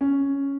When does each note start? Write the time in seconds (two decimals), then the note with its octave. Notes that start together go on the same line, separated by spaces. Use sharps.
0.01 C#4